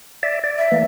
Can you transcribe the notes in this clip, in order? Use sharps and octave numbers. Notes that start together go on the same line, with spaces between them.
D5 E5
D5
E5
E3 A3 A#3